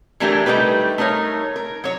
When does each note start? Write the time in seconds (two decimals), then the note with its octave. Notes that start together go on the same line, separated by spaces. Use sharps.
0.20 E3 F#3 A3 D4 G4 A#4
0.46 G3 A3 D#4 G4 B4
0.98 A3 D#4 A#4 C#5
1.56 A#4
1.84 F#3 C#5